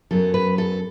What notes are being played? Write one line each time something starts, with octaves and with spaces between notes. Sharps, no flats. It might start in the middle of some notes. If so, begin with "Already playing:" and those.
F#2 F#3 B3 A4
B4
A4